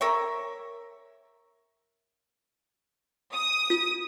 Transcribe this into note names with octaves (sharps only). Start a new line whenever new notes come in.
A#4 C#5 E5
D#6
F4